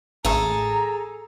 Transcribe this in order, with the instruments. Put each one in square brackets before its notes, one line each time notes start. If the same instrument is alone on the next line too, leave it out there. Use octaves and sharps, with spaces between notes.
[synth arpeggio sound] A1 A3 [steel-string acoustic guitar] G#4 A4 [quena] A#5